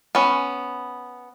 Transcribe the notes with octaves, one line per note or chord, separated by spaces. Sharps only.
B3 C#4